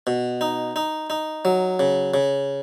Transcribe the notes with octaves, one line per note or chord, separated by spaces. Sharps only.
B2
D#4
D#4
D#4
F#3
C#3
C#3